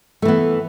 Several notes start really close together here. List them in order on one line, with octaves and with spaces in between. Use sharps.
A3 E3 B3